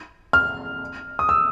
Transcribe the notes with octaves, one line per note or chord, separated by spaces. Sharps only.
F6
D#6
E6